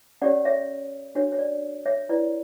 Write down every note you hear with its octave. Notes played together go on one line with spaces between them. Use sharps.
C#4 G4 C#5 D5 F#5
C#5 E5
D4 F#4 C#5
C#5
D5
C#5 E5
E4 B4 D5